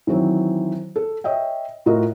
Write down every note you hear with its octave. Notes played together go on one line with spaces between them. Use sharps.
D#3 E3 F#3 C4 C#5
A4
C#5 D#5 E5 G5
A2 F4 F#4 A#4 D#5